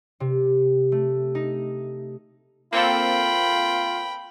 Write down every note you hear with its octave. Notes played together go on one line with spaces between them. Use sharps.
C3
A3
D#4
A#3 C4 F4 A4 G5 B5